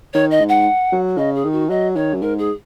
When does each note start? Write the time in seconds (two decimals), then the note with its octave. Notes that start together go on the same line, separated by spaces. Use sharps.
0.14 D#3 C#5
0.31 D#5
0.40 G#2
0.49 F#5
0.92 F#3
1.18 C#3 D#5
1.35 G#4
1.44 D#3
1.53 F#4
1.69 F#3 D#5
1.96 D#3 C#5
2.14 F#2
2.22 G#2 A#4
2.39 G#4